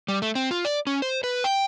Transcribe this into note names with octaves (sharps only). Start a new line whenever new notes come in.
G3
A3
C4
F4
D5
C#4
C5
B4
G5